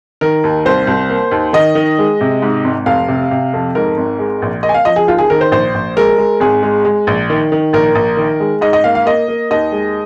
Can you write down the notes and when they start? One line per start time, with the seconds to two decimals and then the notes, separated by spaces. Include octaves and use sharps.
0.21 D#3 A#4
0.44 D#2
0.65 C2 C5
0.87 C2
1.10 A#3
1.31 D#2
1.53 D#3 D#5
1.75 D#3
1.99 G#3
2.21 C3
2.42 G#2
2.64 G#1
2.86 F1 F5
3.08 C3
3.31 C3
3.53 F2
3.75 G#2 A#4
3.97 G#1
4.19 G#3
4.42 A#1
4.63 A#3 D#5
4.69 G#5
4.74 F5
4.85 F3 D#5
4.96 G#4
5.07 D#2 F4
5.19 G#4
5.30 D#3 A#4
5.41 C5
5.51 A#1 C5
5.74 A#1
5.96 G#3 A#4
6.18 G#3
6.40 G#1 G#4
6.63 G#3
6.85 G#3
7.07 A#1
7.30 D#3
7.52 D#3
7.73 A#1 A#4
7.95 A#1
8.17 D#3
8.40 G#3
8.61 G#2 D#5
8.73 D#5
8.84 A#3 F5
8.95 F5
9.06 A#3 D#5
9.28 A#3
9.51 D#2 D#5
9.72 G#3